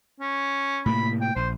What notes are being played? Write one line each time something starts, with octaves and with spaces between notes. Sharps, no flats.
C#4
A2 C3 A#3 B5
G5
A#1 C5